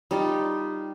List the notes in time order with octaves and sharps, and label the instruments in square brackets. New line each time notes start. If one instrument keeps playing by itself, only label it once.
[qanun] G3 D#4 F4